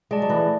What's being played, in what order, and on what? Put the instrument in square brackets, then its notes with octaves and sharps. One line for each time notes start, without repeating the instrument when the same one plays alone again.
[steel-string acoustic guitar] G#3 [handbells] G#4 D5 A5
[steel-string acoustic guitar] F#3
[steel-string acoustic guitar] E3 [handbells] A3